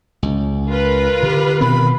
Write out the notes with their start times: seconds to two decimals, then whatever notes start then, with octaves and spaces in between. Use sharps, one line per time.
0.23 C#2
0.68 F4 A#4 B4
1.23 D3 G4
1.61 B2 D#3 C4 B5